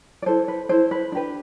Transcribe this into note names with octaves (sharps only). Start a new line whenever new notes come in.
D5
E4 A4 C5
B4
E4 A4 C5
B4
D4 G4 B4